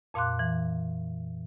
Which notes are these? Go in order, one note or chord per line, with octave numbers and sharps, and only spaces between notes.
F2 A#2 F5 C6 D6 F#6
E3